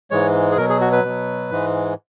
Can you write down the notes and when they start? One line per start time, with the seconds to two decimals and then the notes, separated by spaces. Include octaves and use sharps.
0.11 G#2 E3 G#3 C#5
0.51 G#4
0.57 B2 F#3 A#4
0.69 G#4
0.81 F#4
0.92 B4
1.04 B2 F#3
1.51 G#2 E3 G#3